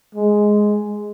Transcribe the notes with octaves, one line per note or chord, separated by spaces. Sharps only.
G#3